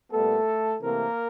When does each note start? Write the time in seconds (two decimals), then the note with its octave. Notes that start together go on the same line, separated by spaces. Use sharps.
0.11 A#2 G3 A3 B3 A4
0.82 C3 E3 A3 A#3 C4 A#4